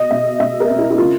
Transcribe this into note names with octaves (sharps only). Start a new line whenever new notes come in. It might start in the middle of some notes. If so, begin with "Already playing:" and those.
Already playing: B2 D#5
B2 E5
B2 E5
A#4
C4
E4
E4
C#3 F4